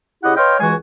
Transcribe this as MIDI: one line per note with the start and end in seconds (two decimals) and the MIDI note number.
0.24 0.34 49
0.24 0.34 64
0.24 0.34 67
0.24 0.34 75
0.24 0.34 78
0.37 0.56 71
0.37 0.56 73
0.37 0.56 75
0.37 0.56 77
0.37 0.56 79
0.37 0.56 84
0.60 0.74 37
0.60 0.74 52
0.60 0.74 56
0.60 0.74 66
0.60 0.74 80